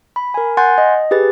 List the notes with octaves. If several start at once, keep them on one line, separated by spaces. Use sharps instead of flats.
B5
A#4 G#5
F#5 G#5 C6 F#6 G6 A6
D#5
G4 G#4 B4 A6